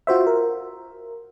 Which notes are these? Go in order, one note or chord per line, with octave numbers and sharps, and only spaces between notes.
F4 F#4 C5 E5
A#4